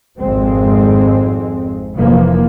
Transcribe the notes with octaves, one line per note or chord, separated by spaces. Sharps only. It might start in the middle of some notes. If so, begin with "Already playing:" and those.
G#1 F2 G#3 C4
F1 E3 F3 A#3